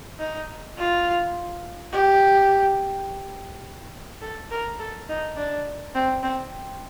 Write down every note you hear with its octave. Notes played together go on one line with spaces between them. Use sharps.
D#4
F4
G4
A4
A#4
A4
D#4
D4
C4
C4